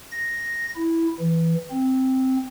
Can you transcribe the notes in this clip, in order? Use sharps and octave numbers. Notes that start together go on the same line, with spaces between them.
A#6
E4
E3
C4